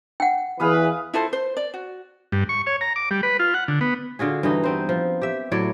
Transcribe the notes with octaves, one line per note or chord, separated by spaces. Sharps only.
F#5 G5
E2 E3 G#4 B4 F5 D#6
E4 F4 A4 C5
C5
D5
F#4
G2
C#6
C#5
A#5
D6
G3
B4
F4
F#5
D3
B3
D3 F4 F#4 G#4
G2 E3 D#4
B3 C4 C5
F3
G4 E5
A2 F#3 C#5 D5